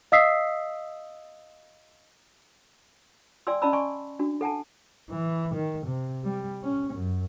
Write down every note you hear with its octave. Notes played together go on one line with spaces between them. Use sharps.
D#5 F5 D#6 E6 B6 C7
D5 G5 G#5 C6 E6
C#4 D5 D#5 A5 B5 E6
D5 G#5 C6 C#6
D4 F#4
A4 F#5 G#5 A5
E3
D#3
C3
G3
C#4
F#2